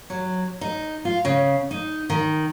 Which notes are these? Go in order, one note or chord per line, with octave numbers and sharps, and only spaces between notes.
F#3
D#4
F4
C#3
D#4
D#3